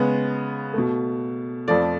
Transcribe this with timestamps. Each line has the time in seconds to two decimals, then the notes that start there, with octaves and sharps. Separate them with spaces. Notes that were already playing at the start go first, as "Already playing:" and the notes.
Already playing: C#3 G#3 B3
0.73 B2 A3
1.68 F2 F3 A3 D5